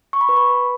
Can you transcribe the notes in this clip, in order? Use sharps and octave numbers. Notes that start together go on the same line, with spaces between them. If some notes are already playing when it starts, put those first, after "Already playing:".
C#6
B5
B4
B5